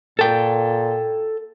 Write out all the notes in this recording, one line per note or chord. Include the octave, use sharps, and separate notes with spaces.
A#2 A4 G5